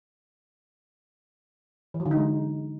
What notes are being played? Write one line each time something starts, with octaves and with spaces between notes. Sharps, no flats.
E3
F#3
D3
D#4
G#3